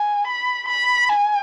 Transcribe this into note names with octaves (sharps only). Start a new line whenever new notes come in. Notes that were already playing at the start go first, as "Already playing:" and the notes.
Already playing: G#5
B5
B5
G#5